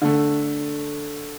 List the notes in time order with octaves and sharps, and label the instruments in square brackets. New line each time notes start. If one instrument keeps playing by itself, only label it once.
[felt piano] D3 A3